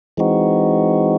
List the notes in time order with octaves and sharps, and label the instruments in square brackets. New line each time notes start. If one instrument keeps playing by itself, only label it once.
[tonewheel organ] E3 G#3 C4 D#4 F#4